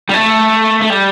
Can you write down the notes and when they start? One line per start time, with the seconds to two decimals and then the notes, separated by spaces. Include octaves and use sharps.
0.10 G3
0.14 A3
0.82 A3
0.90 G3